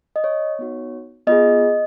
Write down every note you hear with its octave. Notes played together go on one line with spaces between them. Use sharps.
D#5
C#5
B3 D#4 F#4
B3 F4 G#4 D#5